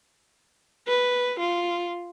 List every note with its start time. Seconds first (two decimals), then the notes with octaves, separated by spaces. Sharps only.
0.88 B4
1.40 F4